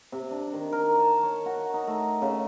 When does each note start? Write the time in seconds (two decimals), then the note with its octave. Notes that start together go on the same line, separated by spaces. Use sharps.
0.12 C3
0.31 D4
0.53 D#3
0.72 A#4
0.99 A5
1.23 C#5
1.46 F#4
1.74 D#4
1.87 A3
2.22 C#3